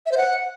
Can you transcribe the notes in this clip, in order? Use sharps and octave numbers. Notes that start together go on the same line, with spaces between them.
E5
C5
F#5